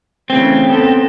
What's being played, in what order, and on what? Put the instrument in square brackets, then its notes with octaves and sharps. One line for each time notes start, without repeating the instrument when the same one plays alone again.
[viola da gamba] C#3 E3 A3 [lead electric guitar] C4
[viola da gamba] B3 A4